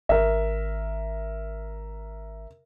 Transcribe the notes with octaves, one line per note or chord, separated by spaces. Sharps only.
G#1 A#4 E5